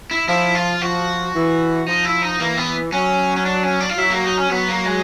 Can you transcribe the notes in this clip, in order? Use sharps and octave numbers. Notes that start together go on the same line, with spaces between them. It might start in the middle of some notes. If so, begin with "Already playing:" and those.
E4
F3 E4
F4
F3 F#4
E3
F3 D#4
E4
D#4
E3 A#3
B3
F#3 C#4
C#4
D4
C#4
D4
F4
F#3 E4
A#3
D#4
C#4
F#3 B3
A#3
G#3